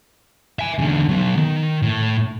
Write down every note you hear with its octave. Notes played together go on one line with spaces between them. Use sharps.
E5 G#5
E2 D3
F#3 B3
D#3
A2